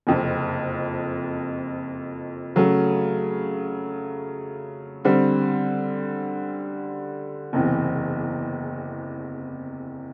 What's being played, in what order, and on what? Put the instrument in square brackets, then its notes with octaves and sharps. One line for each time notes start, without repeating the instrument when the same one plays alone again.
[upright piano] F#1 F2 C3
C#3 F#3 A3
D3 G3 C4
F#1 E2 C3 E3